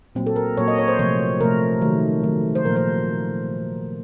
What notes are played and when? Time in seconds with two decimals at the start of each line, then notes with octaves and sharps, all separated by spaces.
0.15 A#2 F#3 A#3 C4
0.27 A4
0.36 A#4
0.57 A#2 F#3 A#3 C#5
0.68 D#5
0.79 C#5
0.88 C5
0.99 C3 F3 A3 C#5
1.40 C3 F3 A3 A#4
1.82 D#3 F#3 A3
2.24 D#3 F#3 A3
2.55 C5
2.65 A#2 F3 A#3 A#4
2.76 C5